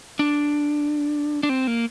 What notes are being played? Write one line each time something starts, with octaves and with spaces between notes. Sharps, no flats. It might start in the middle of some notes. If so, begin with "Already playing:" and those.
D4
D4
C4
A#3